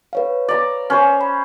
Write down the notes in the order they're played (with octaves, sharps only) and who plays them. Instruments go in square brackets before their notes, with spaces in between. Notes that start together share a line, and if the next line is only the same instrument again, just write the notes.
[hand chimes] B4 C#5 F5
[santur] D5 A#5
C#4 C5
[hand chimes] B5